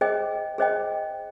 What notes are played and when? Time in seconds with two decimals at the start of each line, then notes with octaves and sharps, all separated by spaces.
0.01 G#4 C5 D#5 G5
0.58 G#4 C5 D#5 G5